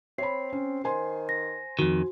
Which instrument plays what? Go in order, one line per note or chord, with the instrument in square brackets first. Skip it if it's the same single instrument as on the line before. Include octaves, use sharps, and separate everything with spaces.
[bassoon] C4 [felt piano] C#5 B5 [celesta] C7
[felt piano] C#4
[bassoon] D#3 [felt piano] C5 G#5 C6
[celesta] A#6
[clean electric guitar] F2 D#3 [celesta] F#4